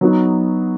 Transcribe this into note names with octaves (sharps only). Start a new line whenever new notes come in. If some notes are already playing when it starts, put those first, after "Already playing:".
F#3 B3 D#4 F#4